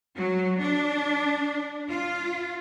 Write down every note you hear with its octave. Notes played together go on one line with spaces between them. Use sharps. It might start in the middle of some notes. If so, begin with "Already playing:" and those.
F#3
D4
F4